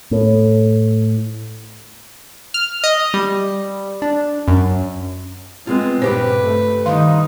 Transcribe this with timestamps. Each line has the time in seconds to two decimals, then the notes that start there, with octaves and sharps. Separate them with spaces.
0.11 A2
2.54 F6
2.84 D#5
3.14 G3
4.02 D4
4.48 F#2
5.67 G#3 B3 C4 F4
6.02 G2 A#2 C#3 G4 B4 C5 G5
6.43 A3
6.86 D#3 G3 D#4 F5 C6